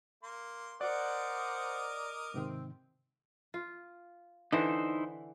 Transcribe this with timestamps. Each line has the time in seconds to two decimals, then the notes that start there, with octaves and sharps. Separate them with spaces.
0.23 A#3 C6
0.81 A#4 C5 D5 D#5 F#5 D6
2.34 G#2 C3 D#3 C4
3.54 F4
4.52 D3 E3 D#4 E4 C5 F#5